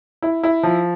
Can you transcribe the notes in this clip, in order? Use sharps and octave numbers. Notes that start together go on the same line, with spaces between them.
E4
E4
F3